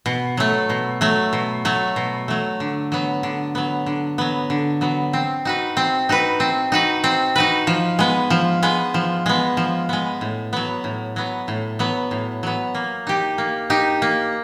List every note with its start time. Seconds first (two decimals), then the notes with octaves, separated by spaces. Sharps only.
0.06 B2
0.37 F#3 A3
0.70 B2
1.01 F#3 A3
1.33 B2
1.65 F#3 A3
1.96 B2
2.28 F#3 A3
2.60 D3
2.92 F#3 B3
3.23 D3
3.55 F#3 B3
3.86 D3
4.18 F#3 B3
4.50 D3
4.81 F#3 B3
5.13 C4
5.45 D#4 F#4 B4
5.77 C4
6.09 D#4 F#4 B4
6.40 C4
6.72 D#4 F#4 B4
7.04 C4
7.36 D#4 F#4 B4
7.67 F3
7.99 G#3 B3
8.30 F3
8.63 G#3 B3
8.94 F3
9.26 G#3 B3
9.57 F3
9.89 G#3 B3
10.21 A2
10.53 F#3 B3
10.84 A2
11.16 F#3 B3
11.48 A2
11.79 F#3 B3
12.11 A2
12.43 F#3 B3
12.75 A#3
13.07 D#4 G4
13.38 A#3
13.70 D#4 G4
14.02 A#3